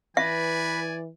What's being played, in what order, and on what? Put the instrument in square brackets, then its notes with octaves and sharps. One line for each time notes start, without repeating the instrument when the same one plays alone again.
[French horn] E3 [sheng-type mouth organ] B4 [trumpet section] D5 G#5 [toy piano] E5